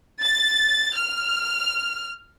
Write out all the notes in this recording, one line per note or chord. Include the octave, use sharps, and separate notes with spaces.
A6
F6